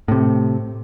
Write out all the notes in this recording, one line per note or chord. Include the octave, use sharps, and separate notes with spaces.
A2 C3